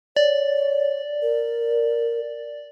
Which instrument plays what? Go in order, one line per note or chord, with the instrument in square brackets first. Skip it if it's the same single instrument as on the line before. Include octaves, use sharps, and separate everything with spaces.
[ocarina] C#5 [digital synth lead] D5
[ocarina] A#4